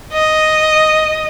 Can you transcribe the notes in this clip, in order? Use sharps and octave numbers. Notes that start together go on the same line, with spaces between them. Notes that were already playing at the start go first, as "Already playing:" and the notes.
D#5